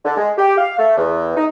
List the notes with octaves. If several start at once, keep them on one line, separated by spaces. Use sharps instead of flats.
D3
G#3
G4
F5
A3
E2
D#4